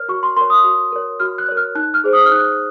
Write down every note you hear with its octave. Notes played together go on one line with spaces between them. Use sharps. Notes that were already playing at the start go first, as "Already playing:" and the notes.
Already playing: A#4 C#5 F6
F#4 C#6
C6
A#4 C#5 C6
D#6
F#4
A#4 C#5
F#4 F6
F#6
A#4 C#5
F6
D#4 F#6
F6
G#4 C5
D#6
F6
D#4 F#6